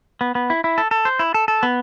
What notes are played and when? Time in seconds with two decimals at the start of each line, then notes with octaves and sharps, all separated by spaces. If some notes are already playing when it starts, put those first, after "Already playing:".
0.21 B3
0.35 B3
0.50 E4
0.64 E4
0.78 A4
0.91 A4
1.05 C5
1.19 E4
1.34 A4
1.48 A4
1.63 B3